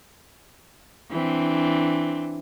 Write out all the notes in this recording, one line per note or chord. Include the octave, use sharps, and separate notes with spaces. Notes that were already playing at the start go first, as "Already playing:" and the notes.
E3 C4 D4